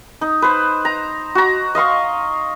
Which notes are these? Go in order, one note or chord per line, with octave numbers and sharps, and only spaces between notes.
D#4
B4 C5
A#5
F#4 A#5
D#5 F5 C6 C#6